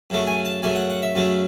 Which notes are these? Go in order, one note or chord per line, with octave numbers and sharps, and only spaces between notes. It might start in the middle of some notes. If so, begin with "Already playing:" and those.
F#2 C#3 F#3 A3
G#5
A5
F#2 C#3 F#3 A3 G#5
F#5
F#5
E5
F#2 C#3 F#3 A3